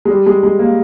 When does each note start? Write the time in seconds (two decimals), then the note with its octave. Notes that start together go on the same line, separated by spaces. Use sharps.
0.05 G#3
0.10 G3
0.26 G#3
0.43 G#3
0.59 A#3